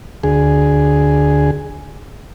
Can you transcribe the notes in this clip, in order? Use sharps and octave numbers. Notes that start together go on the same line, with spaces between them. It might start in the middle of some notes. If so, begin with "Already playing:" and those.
D2 G#4